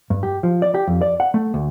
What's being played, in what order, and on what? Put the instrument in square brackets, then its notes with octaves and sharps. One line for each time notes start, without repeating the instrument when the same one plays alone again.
[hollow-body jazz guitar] G2
G4
F3
D5
G4
F2
D5
F#5
A3
D2